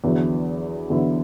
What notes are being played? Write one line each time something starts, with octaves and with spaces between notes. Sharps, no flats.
E2 D3 F#3 B3 E4
E2 D3 F#3 B3 E4